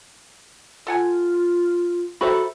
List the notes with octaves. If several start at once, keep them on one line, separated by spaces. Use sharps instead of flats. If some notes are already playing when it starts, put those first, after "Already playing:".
F4 A4 F#5 G#5
F#4 A4 C5 E5 A#5 B5